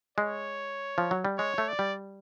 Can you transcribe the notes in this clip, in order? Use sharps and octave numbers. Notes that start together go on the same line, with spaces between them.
G#3 C#5
F3
F#3
G3
G#3 C#5
A3
D5
G3